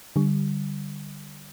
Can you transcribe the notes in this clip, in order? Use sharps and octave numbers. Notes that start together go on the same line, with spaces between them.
D3 G3